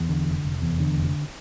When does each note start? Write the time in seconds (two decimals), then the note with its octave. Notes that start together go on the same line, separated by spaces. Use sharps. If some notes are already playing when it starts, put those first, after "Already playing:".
Already playing: E2
0.09 D3
0.26 F1
0.45 F1
0.62 E2
0.80 D3
0.97 F1